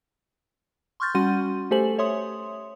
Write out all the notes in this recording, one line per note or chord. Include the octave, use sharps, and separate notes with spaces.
C6 C#6 F6 G6 A6
G3 C#4 F#4 F#5 C6 D#7
A3 G4 A4 C5 G#5 F#7
C#5 E5 C6 D#6